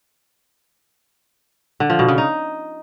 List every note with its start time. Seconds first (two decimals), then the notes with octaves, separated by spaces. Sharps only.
1.80 D3
1.90 F3
1.99 B2
2.08 C#3
2.18 D#4